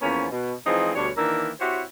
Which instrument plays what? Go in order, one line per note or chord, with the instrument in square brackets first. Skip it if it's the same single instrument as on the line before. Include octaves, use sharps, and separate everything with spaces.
[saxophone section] E2 F3 A#3 B3 C#4
B2
E3 F3 G#3 C4 D#4 G#4
D2 B2 G3 D4 C#5
D#3 E3 A#3 D4 A#4 E5
C4 E4 F#4 G4 C5 C#5